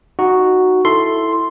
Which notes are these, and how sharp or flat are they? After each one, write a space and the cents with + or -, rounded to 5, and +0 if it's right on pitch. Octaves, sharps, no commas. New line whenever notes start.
D#4 +0 F#4 +0
E4 +0 A4 +0 C6 +0